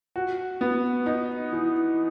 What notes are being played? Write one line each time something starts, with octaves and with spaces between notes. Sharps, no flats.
F#4
B3
D#4
E3